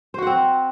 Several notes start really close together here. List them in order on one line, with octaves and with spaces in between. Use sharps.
C5 F#4 F#5 C4